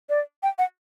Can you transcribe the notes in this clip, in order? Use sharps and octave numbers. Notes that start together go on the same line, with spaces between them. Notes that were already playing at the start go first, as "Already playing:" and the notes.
D5
G5
F#5